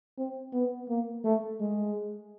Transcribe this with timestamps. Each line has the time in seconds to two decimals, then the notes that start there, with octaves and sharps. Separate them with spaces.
0.18 C4
0.52 B3
0.89 A#3
1.24 A3
1.60 G#3